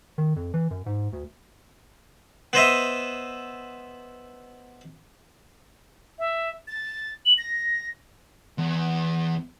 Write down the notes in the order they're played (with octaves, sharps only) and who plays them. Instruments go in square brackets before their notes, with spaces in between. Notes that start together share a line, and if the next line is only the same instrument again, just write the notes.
[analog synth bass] D#3
F2
E3
F#2
G#2
D2
[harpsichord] B3 C5 D#5 E5
[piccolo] E5
A6
F#7
A#6
[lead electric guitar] E2